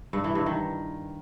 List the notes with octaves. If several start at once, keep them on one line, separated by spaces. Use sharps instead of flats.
G2
E3
G2
D#3